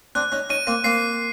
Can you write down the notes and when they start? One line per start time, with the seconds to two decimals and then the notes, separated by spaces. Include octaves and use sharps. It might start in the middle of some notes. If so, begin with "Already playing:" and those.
0.15 C4 D4 F#6
0.32 C#4 D#4
0.50 C#4 D#4 D#7
0.67 A#3 C4
0.84 A#3 C4 C7